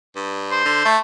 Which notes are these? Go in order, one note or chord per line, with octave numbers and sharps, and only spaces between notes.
G2
C5
D3
A3